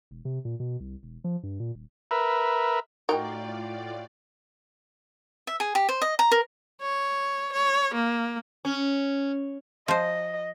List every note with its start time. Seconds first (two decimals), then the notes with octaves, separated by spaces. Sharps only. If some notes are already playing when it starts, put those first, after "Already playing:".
0.11 E1
0.25 C3
0.45 A#2
0.60 B2
0.80 C2
1.03 E1
1.24 F3
1.43 G2
1.60 A#2
1.75 D#1
2.11 A#4 B4 E5
3.09 A2 D#4 F4 F#4 A#4 D5 G5
5.47 E5
5.60 G#4
5.75 G4
5.89 C5
6.02 D#5
6.19 A#5
6.31 A#4
6.81 C#5
7.53 C#5
7.94 A#3
8.65 C#4
9.88 F3 C5 D#5